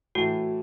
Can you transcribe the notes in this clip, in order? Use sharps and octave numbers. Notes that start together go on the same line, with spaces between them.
A2 E3 A3 F#4